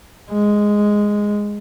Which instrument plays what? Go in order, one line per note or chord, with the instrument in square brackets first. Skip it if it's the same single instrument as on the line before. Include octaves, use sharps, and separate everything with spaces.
[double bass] G#3